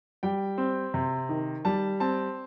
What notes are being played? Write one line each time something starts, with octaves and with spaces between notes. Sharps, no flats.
G3 G5
C4
C3
D#3
G3 A5
C4 A5